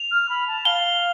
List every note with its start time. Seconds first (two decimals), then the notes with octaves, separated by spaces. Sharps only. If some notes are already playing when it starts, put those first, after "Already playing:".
Already playing: F7
0.11 F6
0.29 B5
0.47 A5
0.65 F5 G7